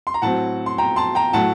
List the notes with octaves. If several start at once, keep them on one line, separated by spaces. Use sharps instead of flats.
C6
A#5
A2 F#3 C4 F#5 A5
C6
G5 A#5
A5 C6
G5 A#5
A2 F#3 A3 F#5 A5